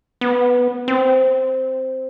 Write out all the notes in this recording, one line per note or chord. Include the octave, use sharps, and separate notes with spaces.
B3
C4